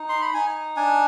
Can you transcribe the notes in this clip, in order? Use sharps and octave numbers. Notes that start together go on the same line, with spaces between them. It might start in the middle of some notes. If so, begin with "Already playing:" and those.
Already playing: D#4
C6
B5
D#4 G#5
D4 G#5